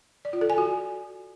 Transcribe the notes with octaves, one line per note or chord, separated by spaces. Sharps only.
D5
F4
A4
G#5
F#4